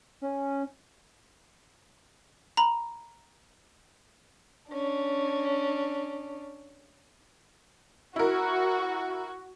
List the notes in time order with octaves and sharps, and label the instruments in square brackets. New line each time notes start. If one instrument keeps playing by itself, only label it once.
[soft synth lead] C#4
[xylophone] A#5 B5
[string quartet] C#4 D4
[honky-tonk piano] E4 A#4 [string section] F#4